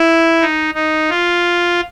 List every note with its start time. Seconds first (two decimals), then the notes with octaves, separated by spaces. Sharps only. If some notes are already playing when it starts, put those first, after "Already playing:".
Already playing: E4
0.41 D#4
0.74 D#4
1.09 F4